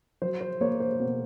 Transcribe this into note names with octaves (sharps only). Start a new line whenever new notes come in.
F#3 C5
C5
A#3 C#5
C5
B2